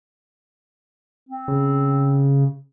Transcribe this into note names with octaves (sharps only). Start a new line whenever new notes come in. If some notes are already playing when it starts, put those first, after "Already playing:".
C4
C#3